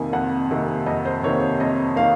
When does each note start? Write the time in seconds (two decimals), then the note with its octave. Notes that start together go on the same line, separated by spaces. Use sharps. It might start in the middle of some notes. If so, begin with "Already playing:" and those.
Already playing: F2 C3 D#3 A#3 G#5
0.13 F2 F#5
0.51 C3 D#3 A#3
0.86 F2 D#5
1.05 C5
1.23 C3 D#3 A#3 C#5
1.60 F2 D#5
1.96 D#3 A#3 F5